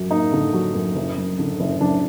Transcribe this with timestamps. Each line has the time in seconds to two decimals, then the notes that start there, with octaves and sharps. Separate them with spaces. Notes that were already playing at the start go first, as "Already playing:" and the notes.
Already playing: F#2 F#3
0.10 A#3 D#4
0.33 D3
0.53 F#3
0.74 F#2
0.96 F#1
1.17 F#2
1.39 D3
1.60 F#1
1.81 F#1 D4